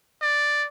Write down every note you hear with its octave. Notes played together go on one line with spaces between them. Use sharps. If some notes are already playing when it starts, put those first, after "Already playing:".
D5